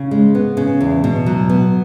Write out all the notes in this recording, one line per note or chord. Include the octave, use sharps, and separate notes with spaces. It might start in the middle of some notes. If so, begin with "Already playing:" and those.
Already playing: C#3
G#3
B3
C#3
E2
B2
F#3
B3